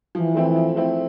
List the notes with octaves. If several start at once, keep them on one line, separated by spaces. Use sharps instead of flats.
E3 F3
A3 C4 E4
F3
A3 C4 E4